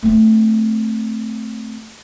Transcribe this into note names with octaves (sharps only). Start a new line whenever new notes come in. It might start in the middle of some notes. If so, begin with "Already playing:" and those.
A3 C4